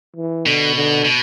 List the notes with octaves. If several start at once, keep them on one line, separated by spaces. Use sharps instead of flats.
E3
B2 D3
D3
B2